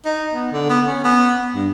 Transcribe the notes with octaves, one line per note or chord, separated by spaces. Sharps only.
D#4
B3
D3
B3
C#4
B3
G2